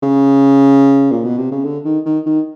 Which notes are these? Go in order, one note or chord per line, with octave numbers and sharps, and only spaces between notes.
C#3
A#2
B2
C3
C#3
D3
D#3
D#3
D#3